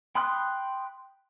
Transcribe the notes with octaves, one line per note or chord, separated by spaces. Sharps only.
G5 B5 C6 D#6 F#6